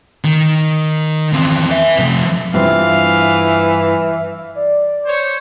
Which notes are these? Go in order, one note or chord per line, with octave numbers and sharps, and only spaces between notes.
D#3
E2 C4
B4 E5
C3 F3
G2 E3 C4 F4 E5 F5
D5
C5 C#5